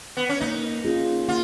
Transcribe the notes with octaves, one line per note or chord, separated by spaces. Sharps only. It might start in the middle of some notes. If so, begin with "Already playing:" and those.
B3
C#4
A#3 D#4
C#4 F4 G#4
A#3 F4